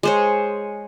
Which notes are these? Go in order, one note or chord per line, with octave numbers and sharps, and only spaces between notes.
G#3 C5 C#5